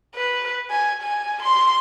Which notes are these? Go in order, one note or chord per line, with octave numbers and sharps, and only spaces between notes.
B4
G#5
G#5
C6